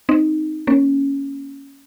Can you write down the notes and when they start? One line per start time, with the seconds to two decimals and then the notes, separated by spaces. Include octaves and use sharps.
0.09 C4 D#4
0.67 A#3 C#4